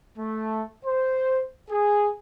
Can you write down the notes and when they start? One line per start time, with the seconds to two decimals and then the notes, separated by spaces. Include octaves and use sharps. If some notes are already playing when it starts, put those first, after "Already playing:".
0.18 A3
0.86 C5
1.71 G#4